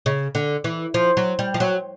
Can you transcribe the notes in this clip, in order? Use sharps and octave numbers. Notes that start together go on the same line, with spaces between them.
C#3
D3
E3
F3
F#3
G3
F3
F#3